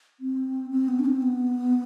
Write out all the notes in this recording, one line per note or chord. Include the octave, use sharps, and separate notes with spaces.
C4
C4
B3
D4
C4
B3